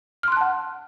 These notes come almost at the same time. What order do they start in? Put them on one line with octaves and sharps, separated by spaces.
F6 C6 F#6 A5 F#5